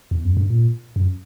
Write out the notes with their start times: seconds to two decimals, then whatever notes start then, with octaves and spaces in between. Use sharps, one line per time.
0.11 E2
0.24 F#2
0.37 G2
0.50 A#2
0.96 F#2